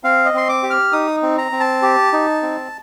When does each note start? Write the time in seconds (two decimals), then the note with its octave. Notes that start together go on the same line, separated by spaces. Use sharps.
0.04 C4 F5
0.25 D#5
0.34 C4 C6
0.49 D6
0.63 G4
0.70 F6
0.92 D#4 D#6
1.22 C4
1.38 A#5
1.52 C4
1.60 A5
1.82 G4
2.13 D#4
2.42 C4